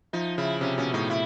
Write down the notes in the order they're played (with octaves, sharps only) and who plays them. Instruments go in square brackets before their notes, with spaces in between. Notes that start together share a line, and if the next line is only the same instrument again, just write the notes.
[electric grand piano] F3 [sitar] D#4
[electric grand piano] C#3 [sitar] E4
[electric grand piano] C3 [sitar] C#4
[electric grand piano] B2 [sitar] C#4
[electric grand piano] A2 [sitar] D#4
[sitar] E4